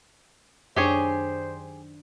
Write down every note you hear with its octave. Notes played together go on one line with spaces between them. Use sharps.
F#2 D#3 D4 G4 G#4 C5 C#5